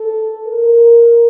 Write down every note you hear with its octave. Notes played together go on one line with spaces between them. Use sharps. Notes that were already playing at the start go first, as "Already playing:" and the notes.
Already playing: A4
A#4